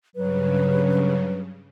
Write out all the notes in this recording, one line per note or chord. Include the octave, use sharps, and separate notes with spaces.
G2 C#3 F#3 B4